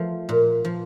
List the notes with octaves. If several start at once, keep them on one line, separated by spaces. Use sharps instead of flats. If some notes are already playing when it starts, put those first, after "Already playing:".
Already playing: F3 A3
A#2
F3